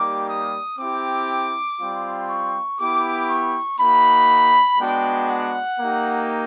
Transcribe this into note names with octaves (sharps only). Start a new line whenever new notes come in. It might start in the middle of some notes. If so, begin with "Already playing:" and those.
Already playing: G3 A#3 D#4 G4 D6
D#6
C4 E4 G4 D6
G3 C4 F4
C#6
B3 E4 G4 D6
C#6
A#3 D#4 F#4 B5
G#3 B3 D4 F#4 G5
F#5
A#3 D#4 G4